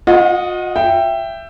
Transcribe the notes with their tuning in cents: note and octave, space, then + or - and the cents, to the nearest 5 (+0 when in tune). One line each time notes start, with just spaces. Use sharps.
F4 +45 D#5 +0 F#5 +0
E5 +20 G5 +0